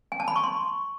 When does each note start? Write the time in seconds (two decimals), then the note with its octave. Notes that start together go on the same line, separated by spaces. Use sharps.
0.12 G#5
0.20 A5
0.28 B5
0.36 C#6
0.44 C6